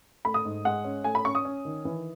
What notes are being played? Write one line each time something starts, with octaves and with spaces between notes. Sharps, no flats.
A3 B5
D#6
G#2
G#3 F#5
C#4
A3 G#5
B5
C#4 C#6
D#6
C#4
D#3
E3